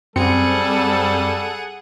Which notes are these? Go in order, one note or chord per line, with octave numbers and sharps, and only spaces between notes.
F#2 G3 C4 G#4 A4 F#5 C#7